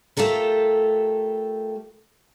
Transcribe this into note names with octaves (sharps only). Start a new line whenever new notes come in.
A3 F4 G4 A4 A#4